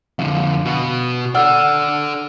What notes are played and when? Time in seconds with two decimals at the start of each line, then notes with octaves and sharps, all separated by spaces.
0.19 F2 D3 F5
0.65 B2 F#4
1.35 A4 D5 F#5 E6 F6